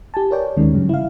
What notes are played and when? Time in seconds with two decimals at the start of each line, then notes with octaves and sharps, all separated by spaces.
0.14 G4 G#5 A5
0.31 A#4 B4 C#5 D5 G5
0.57 D#2 D#3 G#3 C#4
0.73 G2 C#3 F#3
0.89 E4 F5